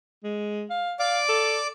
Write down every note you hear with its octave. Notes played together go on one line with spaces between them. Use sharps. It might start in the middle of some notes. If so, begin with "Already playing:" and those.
G#3
F5
D5 F5 D6
A4